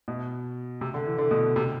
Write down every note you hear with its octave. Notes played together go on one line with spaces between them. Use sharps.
B2
C3
D3
E3
D3
B2
C3